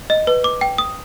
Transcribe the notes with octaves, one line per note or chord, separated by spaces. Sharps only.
D#5
B4
D6
G5
D#6